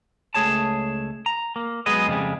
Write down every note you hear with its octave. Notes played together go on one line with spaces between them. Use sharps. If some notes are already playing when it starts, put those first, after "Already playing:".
C#2 A3 G#4 C#5 A5
A#5
A#3
F#3 G#3 B3 G#4 B4 D#5
F2 C#3 G3 G#3